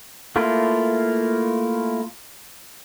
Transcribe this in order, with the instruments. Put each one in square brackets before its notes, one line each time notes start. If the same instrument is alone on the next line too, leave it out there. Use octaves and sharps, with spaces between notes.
[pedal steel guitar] A3 A#3 E4 F4